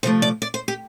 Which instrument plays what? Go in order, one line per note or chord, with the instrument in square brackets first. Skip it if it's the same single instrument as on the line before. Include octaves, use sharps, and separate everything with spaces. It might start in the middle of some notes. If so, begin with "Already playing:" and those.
[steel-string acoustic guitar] C3 F3 A3 C5
D5
D5
C5
G4